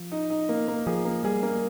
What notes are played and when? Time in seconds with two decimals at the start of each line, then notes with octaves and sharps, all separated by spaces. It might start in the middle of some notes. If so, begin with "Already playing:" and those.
Already playing: F3
0.12 D#4
0.30 D#4
0.49 A#3
0.68 A#3
0.86 F3 G#4
1.05 A#3
1.24 G3 G#4
1.43 A#3